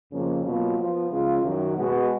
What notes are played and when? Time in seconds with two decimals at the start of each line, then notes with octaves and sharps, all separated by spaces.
0.11 F2 C#3 F3 A#3 C#4
0.43 B2 F#3 A#3 F4
0.77 F3 B3 F4
1.10 C#3 F3 G#3 C#4 F4
1.42 F#2 D#3 F#3
1.75 B2 G#3 B3 F#4